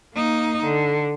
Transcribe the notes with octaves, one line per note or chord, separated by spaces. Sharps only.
A#3 D#4
D3